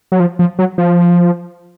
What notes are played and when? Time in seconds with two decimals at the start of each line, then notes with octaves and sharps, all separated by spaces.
0.12 F#3
0.20 F3
0.39 F3
0.59 F#3
0.78 F3